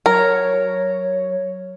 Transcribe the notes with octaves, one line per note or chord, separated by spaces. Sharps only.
F#3 A#4 C#5